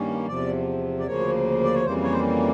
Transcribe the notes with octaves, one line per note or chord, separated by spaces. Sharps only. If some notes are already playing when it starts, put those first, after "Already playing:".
Already playing: G2 D#3 G3 A#3 C#4
E2 C3 F3 D5
D5
D2 C#3 F3 A#3 C#5
D5
C#5
F2 C#3 E3 G3 A#3 C5
C#5
C5